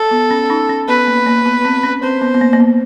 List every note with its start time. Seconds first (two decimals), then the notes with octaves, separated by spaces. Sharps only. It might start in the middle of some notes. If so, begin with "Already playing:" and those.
Already playing: A4
0.11 B3
0.31 C#4
0.50 C#4 D#4
0.69 C#4
0.88 B3 B4
1.07 A#3
1.26 A#3
1.45 B3
1.65 C4
1.83 C#4
2.03 C4 C5
2.21 B3
2.34 B3
2.41 A#3
2.53 A#3
2.60 B3